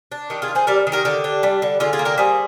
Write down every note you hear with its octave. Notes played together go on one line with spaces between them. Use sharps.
D4
D#3 G4
F4 G#4
D4
G#4 C5
G3 A#4 D5
D#3
G4 A#4
D3 G4
D4
G3
D3
D3 F4 G#4
F4 G#4
A#3
G4 A#4
G3 G#4 C5